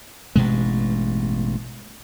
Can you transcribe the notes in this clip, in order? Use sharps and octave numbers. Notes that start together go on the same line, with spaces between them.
A1 G2 B2 G#3